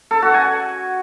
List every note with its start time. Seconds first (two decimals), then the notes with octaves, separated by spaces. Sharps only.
0.11 A4
0.22 F#4
0.34 G#5